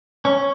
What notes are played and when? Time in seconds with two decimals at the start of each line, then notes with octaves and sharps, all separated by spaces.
0.25 C#4